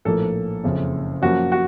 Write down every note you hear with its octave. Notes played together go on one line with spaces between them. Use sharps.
A#1 A2 F3 A#3 A4
F#1 F2 C#3
F#2 F3 A#3 F#4
F#4